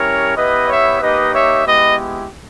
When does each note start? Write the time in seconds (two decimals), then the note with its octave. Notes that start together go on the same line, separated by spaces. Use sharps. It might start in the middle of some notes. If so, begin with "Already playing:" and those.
Already playing: G3 C#4 E4 G4 A#4 C#5
0.36 B3 E4 G4 B4 D#5
0.68 C#5 E5
1.01 A#3 D#4 G4 B4 D#5
1.33 C#5 E5
1.65 G#3 B3 E4 G4 B4 D#5